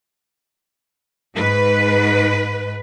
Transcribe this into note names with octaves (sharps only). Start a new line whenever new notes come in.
G#2 B4